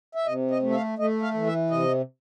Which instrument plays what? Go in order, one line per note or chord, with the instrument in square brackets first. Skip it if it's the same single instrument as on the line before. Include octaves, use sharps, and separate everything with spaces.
[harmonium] E5
C3 D#5
D#5
A3
E5
F5
A3 D#5
F5
E3
E5
C3 D#5